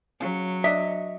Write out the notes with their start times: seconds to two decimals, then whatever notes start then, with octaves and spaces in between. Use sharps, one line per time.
0.21 C#3 F#3
0.64 D4 D#5 E5